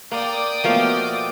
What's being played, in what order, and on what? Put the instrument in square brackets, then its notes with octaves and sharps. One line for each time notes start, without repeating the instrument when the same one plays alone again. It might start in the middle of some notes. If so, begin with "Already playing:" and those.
[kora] A#3 [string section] D5 G5 D#6
[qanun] B2 A#3 D#5 [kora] F3 A3 F5